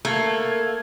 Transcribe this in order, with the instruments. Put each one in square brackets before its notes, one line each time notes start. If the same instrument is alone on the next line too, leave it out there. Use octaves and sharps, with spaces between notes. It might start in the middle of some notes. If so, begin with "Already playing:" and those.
[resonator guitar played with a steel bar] A3 [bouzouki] A#3 [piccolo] G#6